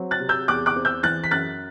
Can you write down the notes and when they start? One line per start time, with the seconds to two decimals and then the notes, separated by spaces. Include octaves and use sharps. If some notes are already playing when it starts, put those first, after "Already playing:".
Already playing: F#3 C4
0.11 F#6 A6
0.20 C3
0.29 E6 G6
0.48 E2 D6 F#6
0.66 D6 F#6
0.76 C4
0.85 E6 G6
1.03 E3 F#6 A6
1.24 B6
1.31 F#2 F#6 A6